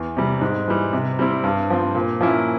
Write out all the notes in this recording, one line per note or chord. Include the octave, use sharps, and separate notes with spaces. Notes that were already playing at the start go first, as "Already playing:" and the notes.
Already playing: E2
C3 G3
G#2
E3 G3
C3
G3 C4 E4
G2
F3 C4
A#2
F3 A#3 C#4 E4